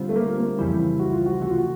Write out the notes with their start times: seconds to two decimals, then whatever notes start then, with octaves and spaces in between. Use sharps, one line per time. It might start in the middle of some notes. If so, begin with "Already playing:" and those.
Already playing: D3 G3 C4 F4
0.09 A3
0.16 A#3
0.38 A#3
0.58 F2 C#3 E3 G3 C4 E4
0.99 F#4
1.13 F4
1.26 F#4
1.42 C3 E3 A3 F#4
1.51 F4
1.58 F#4